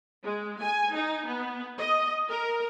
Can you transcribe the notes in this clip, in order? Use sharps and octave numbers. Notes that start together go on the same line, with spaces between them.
G#3
G#5
D#4
B3
D#5
A#4